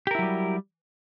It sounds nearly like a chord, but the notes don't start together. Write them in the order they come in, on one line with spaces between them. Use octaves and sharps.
G4 A#4 E4 F#3 G3